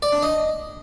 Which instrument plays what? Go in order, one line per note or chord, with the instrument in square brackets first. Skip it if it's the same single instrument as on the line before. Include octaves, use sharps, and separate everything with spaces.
[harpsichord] D5
D4
D#5